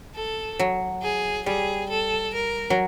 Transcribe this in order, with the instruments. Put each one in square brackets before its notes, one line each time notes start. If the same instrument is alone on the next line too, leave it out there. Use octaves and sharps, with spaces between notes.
[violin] A4
[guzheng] F#3
[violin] G#4
[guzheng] G3 [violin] G#4
[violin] A4
A#4
[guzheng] F#3